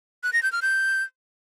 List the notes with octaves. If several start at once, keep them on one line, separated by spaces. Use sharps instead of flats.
F#6
A#6
G6
F6
G6